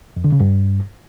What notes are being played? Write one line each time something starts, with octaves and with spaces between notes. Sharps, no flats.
F2
D3
C#3
G2